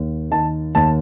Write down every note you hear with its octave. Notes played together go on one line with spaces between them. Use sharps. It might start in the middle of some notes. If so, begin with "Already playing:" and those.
Already playing: D#2
D#3 A5
D#2 A5